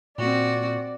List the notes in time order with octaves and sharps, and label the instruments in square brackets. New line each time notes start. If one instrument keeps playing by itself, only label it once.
[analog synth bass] A#2 [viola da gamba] C4 F#4 [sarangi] D5